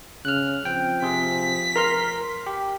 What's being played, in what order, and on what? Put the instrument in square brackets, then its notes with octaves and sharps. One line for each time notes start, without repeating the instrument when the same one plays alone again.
[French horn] C#3 [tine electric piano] F6 F#6
[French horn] F3 [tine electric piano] C4 G5
[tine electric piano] C3 G#4 [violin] B6
[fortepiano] A#4 [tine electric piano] A#5 C6 F6
[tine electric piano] G4